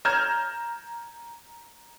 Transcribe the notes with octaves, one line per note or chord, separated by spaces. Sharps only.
A#5 F6 G6 G#6 E7